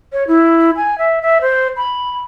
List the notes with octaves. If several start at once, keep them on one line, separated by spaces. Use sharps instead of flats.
C#5
E4
G#5
E5
E5
C5
B5